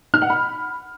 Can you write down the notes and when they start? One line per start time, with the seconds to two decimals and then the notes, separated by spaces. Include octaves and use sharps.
0.14 F6
0.22 F#5
0.30 B5